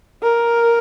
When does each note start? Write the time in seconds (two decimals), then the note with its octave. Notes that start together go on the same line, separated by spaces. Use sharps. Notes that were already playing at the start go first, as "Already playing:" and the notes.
0.22 A#4